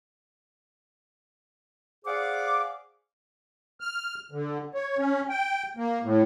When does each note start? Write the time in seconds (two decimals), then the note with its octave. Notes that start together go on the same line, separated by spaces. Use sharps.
2.05 G#4 C5 D5 F5 F#5 D6
3.80 F6
4.32 D3
4.74 C#5
4.98 C#4
5.29 G5
5.77 A#3
6.04 A2